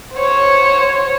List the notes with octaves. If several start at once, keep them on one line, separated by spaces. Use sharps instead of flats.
C5 C#5